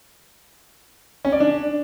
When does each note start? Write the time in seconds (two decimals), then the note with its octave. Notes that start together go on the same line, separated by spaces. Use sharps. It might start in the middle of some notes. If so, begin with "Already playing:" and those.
1.25 C#4
1.32 D5
1.40 D4